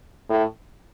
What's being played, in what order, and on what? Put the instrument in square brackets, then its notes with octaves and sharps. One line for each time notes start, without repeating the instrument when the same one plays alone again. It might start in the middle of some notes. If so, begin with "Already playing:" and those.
[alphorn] A2